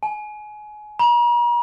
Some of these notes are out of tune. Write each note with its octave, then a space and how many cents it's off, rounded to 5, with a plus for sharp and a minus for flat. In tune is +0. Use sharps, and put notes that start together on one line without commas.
G#5 +25
A#5 +45